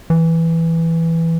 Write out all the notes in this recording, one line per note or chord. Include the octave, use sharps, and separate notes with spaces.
E3